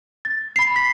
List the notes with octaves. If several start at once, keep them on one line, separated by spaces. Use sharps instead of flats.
A6
B5 C7
B6